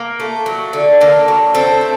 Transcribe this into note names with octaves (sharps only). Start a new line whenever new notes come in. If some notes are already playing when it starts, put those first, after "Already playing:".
Already playing: A#3
A3
F#3
D3
D3 A#3
F#3
A3 C4
A3